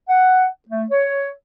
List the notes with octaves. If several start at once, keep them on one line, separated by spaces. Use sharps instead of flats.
F#5
A3
C#5